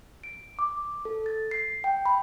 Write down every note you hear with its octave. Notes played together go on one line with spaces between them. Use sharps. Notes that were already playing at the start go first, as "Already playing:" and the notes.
D7
D6
A4
A6
C7
G5
B5